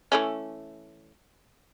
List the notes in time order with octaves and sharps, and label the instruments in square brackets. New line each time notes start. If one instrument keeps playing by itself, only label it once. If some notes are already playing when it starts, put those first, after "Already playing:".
[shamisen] E3 A3 C#4